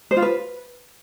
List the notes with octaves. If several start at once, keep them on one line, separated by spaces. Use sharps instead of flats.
C5
F4
B4